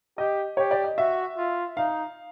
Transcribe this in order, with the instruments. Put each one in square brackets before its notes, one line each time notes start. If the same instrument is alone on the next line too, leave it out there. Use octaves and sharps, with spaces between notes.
[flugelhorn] G4 [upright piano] D#5
[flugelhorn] G4 [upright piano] C#5
[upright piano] D5
D#5
[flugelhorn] F#4 [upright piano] E5
[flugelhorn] F4
[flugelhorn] D#4 [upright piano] F5